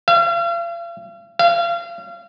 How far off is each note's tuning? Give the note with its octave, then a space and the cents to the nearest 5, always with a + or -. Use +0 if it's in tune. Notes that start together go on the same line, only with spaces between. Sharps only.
F5 -40
F5 -30